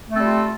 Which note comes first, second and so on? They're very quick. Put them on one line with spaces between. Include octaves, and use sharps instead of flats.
A3 C4 A4 G3 F4